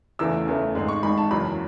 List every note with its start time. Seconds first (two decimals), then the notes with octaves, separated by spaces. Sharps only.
0.19 E2 C#3 E3 A3 E6
0.46 E2 C#3 E3 A3
0.75 G#1 G#2 G#3
0.88 C#6
1.03 G#1 G#2 G#3 B5
1.18 A5
1.31 F#1 E2 C#3 F#3 B5